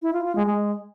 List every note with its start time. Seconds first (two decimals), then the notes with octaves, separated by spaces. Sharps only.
0.02 E4
0.13 F4
0.24 F4
0.35 G#3
0.46 G#3